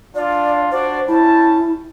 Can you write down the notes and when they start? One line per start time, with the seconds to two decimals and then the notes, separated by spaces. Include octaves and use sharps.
0.15 D4 F4 D5
0.72 D4 F#4 C5 D5
1.08 G3 C#4 E4 A5